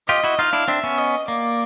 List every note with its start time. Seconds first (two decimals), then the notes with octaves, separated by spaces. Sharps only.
0.09 F4 G4 D#5
0.24 E4 F#4
0.39 D#4 F4 F5
0.53 D4 E4
0.68 C4 D4 E5
0.84 B3 C#4
0.98 D#5
1.28 A#3 D5